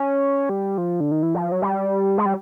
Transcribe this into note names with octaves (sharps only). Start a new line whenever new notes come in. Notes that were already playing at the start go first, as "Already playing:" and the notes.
Already playing: C#4
G3
F3
D3
D#3
E3
F3
F#3
G3
G#3
G3